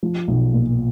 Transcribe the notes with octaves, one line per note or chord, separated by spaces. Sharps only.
F3
B1
A#2